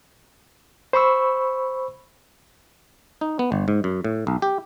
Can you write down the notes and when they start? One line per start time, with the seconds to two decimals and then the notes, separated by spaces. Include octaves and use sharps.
0.93 C5 B5 C#6 E6
3.21 D#4
3.39 B3
3.52 G1
3.68 G#2
3.84 F#2
4.04 A2
4.27 B1
4.42 G4